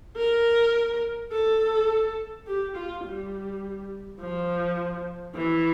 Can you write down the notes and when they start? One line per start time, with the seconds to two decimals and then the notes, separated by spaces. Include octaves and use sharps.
0.17 A#4
1.32 A4
2.47 G4
2.76 F4
3.04 G3
4.19 F3
5.35 E3